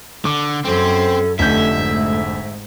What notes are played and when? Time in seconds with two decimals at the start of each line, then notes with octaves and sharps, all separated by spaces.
0.25 D3 D6
0.65 F#2 C4 C#4 A4 C5
1.39 F1 D3 A3 C#4 E5 G6
1.74 G#2